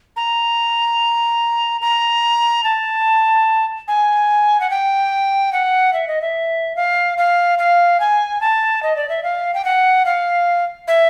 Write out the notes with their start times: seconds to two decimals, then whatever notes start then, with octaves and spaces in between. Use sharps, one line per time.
0.16 A#5
1.81 A#5
2.64 A5
3.88 G#5
4.60 F#5
4.70 G5
5.53 F#5
5.93 E5
6.08 D#5
6.22 E5
6.76 F5
7.18 F5
7.59 F5
8.00 G#5
8.41 A5
8.83 D#5
8.96 D5
9.09 E5
9.23 F5
9.54 G5
9.65 F#5
10.06 F5
10.88 E5